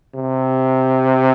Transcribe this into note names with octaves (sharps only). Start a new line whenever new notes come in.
C3